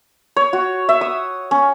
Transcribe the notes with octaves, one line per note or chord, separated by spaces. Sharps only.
C#5
F#4
E5
D#6
C#4